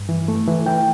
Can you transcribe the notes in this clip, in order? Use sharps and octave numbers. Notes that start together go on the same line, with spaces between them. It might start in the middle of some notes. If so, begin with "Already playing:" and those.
Already playing: G2
E3
A3
E3
E3 G5